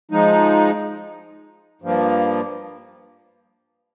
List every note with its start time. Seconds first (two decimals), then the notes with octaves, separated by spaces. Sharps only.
0.11 F3 G#3 D#4
1.82 G2 F3 A#3